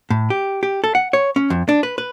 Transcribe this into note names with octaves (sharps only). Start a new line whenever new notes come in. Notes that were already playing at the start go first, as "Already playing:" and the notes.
A2
G4
G4
A4
F#5
C#5
C#4
F2
D4
B4
B4